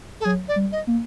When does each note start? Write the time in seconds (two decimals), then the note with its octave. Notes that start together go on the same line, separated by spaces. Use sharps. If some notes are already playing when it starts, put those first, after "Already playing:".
0.21 A4
0.25 F#3 G#4
0.48 D5
0.56 G3
0.72 D#5
0.87 A#3